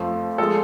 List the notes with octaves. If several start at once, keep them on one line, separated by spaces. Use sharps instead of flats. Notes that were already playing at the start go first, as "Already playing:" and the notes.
Already playing: F2 F3 A3
F3 G#3 A4